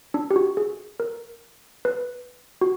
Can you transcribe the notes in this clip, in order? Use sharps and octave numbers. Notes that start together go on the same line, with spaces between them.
D4
G4
F#4
G#4
A#4
B4
F#4